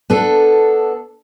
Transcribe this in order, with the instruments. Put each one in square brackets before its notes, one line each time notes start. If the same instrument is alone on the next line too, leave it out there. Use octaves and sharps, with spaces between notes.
[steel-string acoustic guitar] B3 D4 A4